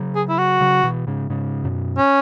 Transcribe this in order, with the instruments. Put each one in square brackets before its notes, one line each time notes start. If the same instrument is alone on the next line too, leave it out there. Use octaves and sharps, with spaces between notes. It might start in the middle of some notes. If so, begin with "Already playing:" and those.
Already playing: [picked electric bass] C#3 F#3
[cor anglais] G#4
E4
F#4
[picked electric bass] C#3 F#3
B2 E3
G#2 C#3
G#2 C#3
F#2 B2
[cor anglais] C#4